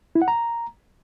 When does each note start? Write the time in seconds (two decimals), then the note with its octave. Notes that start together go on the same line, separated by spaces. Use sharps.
0.15 E4
0.22 F#5
0.28 A#5